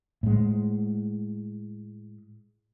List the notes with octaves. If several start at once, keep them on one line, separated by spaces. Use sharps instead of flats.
A2 G#3